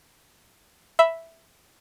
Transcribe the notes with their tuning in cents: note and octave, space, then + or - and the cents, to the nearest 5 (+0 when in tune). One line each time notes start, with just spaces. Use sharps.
E5 +0 B5 +0